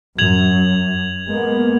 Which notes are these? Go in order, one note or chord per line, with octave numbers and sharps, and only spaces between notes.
F#2 G#6 F7 F#7
G#3 A#3 B3